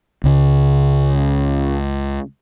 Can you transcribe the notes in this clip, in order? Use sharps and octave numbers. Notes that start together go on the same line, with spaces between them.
C#2 C#3